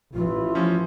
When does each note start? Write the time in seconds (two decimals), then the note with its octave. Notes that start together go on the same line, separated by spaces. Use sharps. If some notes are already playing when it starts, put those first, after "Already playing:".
0.14 A1 E3 F4
0.55 F3 C#4